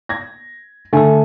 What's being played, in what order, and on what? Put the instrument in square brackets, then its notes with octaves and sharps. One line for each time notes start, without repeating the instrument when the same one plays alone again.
[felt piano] G#6 A#6
[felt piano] D3 G#5 [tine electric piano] A3 A4